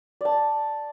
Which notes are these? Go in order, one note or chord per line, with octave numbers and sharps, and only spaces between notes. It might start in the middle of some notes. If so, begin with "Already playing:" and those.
D5 A5